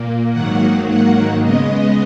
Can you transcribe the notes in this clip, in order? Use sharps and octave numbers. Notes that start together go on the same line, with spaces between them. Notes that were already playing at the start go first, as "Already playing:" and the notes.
Already playing: A#2 A#3
G#2 D#3 F#3 A#3 F#5
F#5
C#3 G#3 B3 D#5